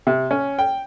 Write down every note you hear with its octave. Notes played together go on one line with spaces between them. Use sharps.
C3
C#4
G5